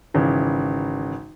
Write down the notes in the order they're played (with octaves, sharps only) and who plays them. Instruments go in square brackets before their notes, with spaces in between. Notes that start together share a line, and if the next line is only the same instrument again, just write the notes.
[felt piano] G#1 C#3 E3